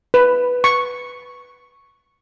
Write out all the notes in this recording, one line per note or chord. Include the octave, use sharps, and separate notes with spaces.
B4
C#6